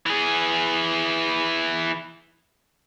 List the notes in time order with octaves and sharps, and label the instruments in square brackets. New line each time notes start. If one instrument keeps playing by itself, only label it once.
[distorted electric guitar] E3 G#4